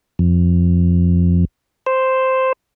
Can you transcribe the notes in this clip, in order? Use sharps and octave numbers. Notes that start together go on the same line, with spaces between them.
F2
C5